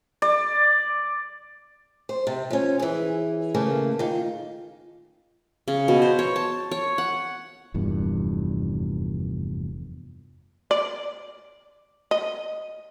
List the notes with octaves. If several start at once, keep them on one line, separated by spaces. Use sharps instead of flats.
D5
C5
C3
F3 C#4
E3 G#4
C#3 A3 A#3
D#3 F4
C#3
B2
C5
C#5
A5
C#5
F#5
F1 E2 G2 A#2
D5
D#5